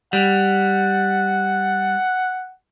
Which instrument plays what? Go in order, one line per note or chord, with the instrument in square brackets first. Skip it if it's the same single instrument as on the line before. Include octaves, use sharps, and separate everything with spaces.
[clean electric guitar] G3 [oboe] F#5